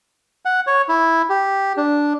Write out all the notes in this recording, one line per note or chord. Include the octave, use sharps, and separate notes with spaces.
F#5
C#5
E4
G4
D4